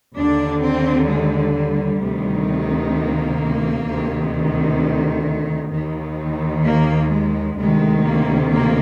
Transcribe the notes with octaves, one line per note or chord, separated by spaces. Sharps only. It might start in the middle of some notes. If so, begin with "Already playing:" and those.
D#2 D3 D4
C4
G#3
G3
D2 C3 D#3
A#3
D2 C3 D#3
D#2 D#3
A#3
G#3
D2 C3 D#3 G#3
A#3
A#3